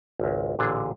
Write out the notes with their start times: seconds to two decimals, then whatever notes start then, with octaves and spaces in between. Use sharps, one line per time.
0.19 G#1 C#2
0.59 A1 A#2 D3 D4 G#4